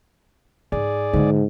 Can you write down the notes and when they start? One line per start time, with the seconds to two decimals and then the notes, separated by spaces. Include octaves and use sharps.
0.72 G#2 G#4 D5
1.14 G#2 D3 E3